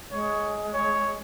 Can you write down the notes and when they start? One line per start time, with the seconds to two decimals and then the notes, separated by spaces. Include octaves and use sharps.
0.11 G#3 C#5
0.73 C#5